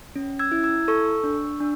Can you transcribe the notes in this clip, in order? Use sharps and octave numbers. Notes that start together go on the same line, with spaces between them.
C#4
E6 G#6
E4
E6 G#6
A4 C#6 E6
D4
D4